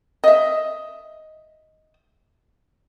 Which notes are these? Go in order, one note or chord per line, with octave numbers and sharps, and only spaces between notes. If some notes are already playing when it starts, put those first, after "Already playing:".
D#5 E5